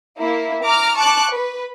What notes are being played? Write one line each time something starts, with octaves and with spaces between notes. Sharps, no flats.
A#3 E4
A#5 D6 F6
A5 C#6 D6 F#6
B4